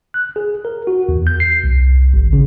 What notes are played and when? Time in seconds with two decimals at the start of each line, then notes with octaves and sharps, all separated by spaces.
0.14 F#6
0.36 G#4
0.65 A#4
0.87 F#4
1.09 E2
1.27 G6
1.40 C7
1.64 C2
2.14 G#1
2.33 C#3